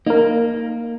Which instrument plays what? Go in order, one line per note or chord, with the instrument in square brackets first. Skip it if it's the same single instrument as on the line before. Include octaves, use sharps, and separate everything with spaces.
[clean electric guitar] A#3 [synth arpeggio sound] D#4 A#4